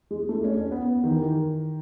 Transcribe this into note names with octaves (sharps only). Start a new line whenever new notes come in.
G#3
A3
C#4
C#4
B3
B3
D#3
E3
D#3